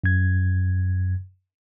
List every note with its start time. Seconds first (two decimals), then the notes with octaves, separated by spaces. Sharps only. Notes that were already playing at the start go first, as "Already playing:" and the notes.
0.04 F#2 G#6